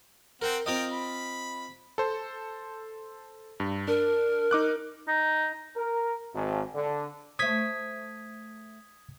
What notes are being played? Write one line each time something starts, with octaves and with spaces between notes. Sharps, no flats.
C4 A#4 F#5 G5
C4 F4 A#4 D#5 G5
B5
A4 C5
G2
D4 A#4
D#4 D6 F#6
D#4
A#4
G#1
D3
A3 C5 C#5 D#6 G#6 B6